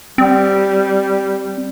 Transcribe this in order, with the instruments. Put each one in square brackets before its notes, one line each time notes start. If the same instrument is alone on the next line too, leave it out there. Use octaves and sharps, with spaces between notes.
[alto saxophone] G3 [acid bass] C4